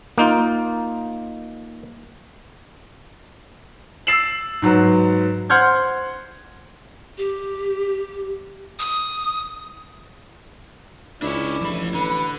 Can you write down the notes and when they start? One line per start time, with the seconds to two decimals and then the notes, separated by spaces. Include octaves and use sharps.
0.18 A#3 D#4 F4
4.07 E6 A6 C7 E7 F#7
4.62 G#2 F#3 B4
5.50 C5 F#5 C6 F6 G6 G#6
7.18 G4
8.79 D#6
11.22 C#2 D4 E4 C#5 D5
11.62 A1 F3 B5
11.94 D3 B4